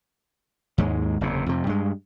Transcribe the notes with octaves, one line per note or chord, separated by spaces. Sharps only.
D#2 G#2 G#3
F#1 E2 C3
F2 C3
G2 G#3